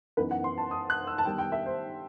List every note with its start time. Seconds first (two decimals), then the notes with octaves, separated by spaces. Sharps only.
0.17 F#2 E3 B3 D#4 B4
0.31 F#5
0.44 C6
0.58 A5
0.71 D#6
0.90 F#6
1.07 E6
1.18 A5
1.25 D#3 G3 B3 G5
1.38 G5
1.52 E5
1.66 C5